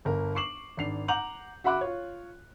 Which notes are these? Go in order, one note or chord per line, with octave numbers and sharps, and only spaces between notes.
G1 A#4
C#6 D6 C7 E7 F#7
G#1 D4 C7 F7
F#5 A#5 D6 G6 F7 F#7
F#4 E5 F#5 B5 D6 F#6
F4 C#5